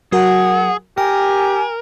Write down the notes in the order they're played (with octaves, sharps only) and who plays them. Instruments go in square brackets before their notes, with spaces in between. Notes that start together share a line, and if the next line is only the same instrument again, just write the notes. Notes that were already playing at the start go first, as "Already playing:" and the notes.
[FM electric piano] F#3 F#4 A#4 [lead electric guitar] G#4 [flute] F#5
[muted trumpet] G4 [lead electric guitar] A#4 [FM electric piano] G5 [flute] G#5